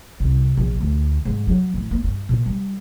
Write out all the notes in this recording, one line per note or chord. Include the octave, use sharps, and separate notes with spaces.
C2
A#1
D2
G#2
F#3
A1
A#3
G2
A#2
G3